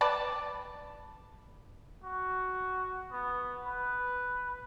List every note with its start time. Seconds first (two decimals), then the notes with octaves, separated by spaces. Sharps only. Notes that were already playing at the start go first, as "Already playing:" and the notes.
0.01 B4 D5 A5
2.04 F#4
3.12 B3
3.66 B4